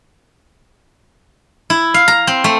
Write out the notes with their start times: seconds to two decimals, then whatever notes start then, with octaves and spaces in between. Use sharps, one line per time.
1.70 E4
1.94 F5
2.08 A#5
2.27 C4
2.44 A3